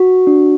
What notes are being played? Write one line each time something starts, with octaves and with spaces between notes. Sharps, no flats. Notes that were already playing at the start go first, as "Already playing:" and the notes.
Already playing: F#4
D4